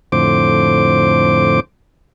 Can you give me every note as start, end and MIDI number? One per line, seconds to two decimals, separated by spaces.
0.12 1.60 41
0.12 1.60 45
0.12 1.60 50
0.12 1.60 72
0.12 1.60 86